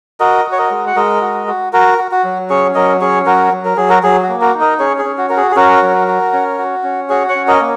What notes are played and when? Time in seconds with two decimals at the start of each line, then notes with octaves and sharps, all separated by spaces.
0.20 F#4 A#4 D#5
0.45 F#4
0.52 C#5
0.58 A#4 D#5
0.71 G#3
0.87 F#5
0.96 G#3 A#4 D#5
1.21 F#4
1.47 F#4
1.73 F#4 A#4
1.98 F#4
2.11 F#4
2.24 F#3
2.50 C#4 G#4 C#5
2.75 F#3 A#4 D#5
3.01 C#4 G#4 C#5
3.26 F#3 F#4 A#4
3.52 F#3
3.65 A#4
3.77 F#3 G#4
3.89 F#4 A#4
4.03 F#3 G#4
4.23 F#4
4.29 A#3
4.41 F#4 A#4
4.54 D#4
4.60 A#4 D#5
4.79 C#4 G#4 C#5
4.98 G#4
5.05 C#4
5.18 F#4
5.29 F#4 A#4
5.37 G#4
5.51 G#4
5.56 C#4 F#4 A#4
5.82 F#3
6.08 F#4
6.33 C#4
6.58 F#4
6.83 C#4
7.09 F#4 G#4 C#5
7.29 C#5 F#5
7.35 C#4
7.48 A#4 D#5
7.61 A#3